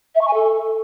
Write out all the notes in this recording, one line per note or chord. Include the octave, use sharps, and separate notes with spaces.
E5
C#6
G#5
A4